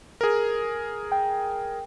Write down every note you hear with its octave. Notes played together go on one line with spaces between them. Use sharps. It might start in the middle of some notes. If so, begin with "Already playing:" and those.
G#4 A#4
G5